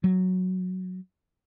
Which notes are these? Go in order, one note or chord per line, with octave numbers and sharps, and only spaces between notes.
F#3